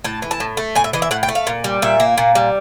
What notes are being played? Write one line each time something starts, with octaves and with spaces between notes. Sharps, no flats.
A2 A5
E3
A5
A2
A3
A2 G#5
E5
E3 D#5
E5
A2 F#5
G5
A3
F5
A#2
G3
A#2 E5
A#3
A#2
G3